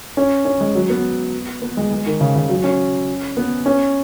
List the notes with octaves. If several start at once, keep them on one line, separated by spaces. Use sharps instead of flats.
C#4
C#4
G#3
F#3
B3
B3
G#3
G#3
D#3
C#3
C#3
F#3
C#4
B3
C#4